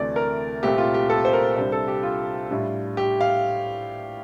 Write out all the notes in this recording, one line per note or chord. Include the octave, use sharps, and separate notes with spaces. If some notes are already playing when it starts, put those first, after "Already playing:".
Already playing: D2 C3 E3 A3 D5
A#4
C2 A#2 A3 C4 G4
F4
G4
A4
C5
A#4
C2 C3 G3 D4 C5
A4
G4
F4
A2 G3 D4
G4
F5